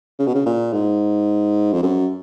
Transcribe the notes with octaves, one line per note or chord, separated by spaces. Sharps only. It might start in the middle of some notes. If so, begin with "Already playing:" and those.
C#3
B2
C#3
A#2
G#2
F2
F#2